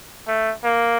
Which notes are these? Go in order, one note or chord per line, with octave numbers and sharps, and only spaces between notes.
A3
A#3